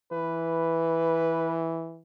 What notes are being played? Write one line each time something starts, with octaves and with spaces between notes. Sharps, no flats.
E3 B4